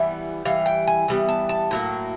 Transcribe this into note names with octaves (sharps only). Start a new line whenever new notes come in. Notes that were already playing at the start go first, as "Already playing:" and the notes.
Already playing: E3 G3 B3 E5
E3 G3 F5
G5
G#5
E3 G3 B3
A5
A5
A2 F#3 A#3